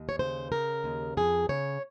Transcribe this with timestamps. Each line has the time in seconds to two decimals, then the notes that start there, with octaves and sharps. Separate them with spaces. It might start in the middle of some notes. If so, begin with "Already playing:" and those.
Already playing: D#2
0.09 C#5
0.19 C#3 C5
0.52 C#3 A#4
0.84 D#2
1.17 F2 G#4
1.49 C#3 C#5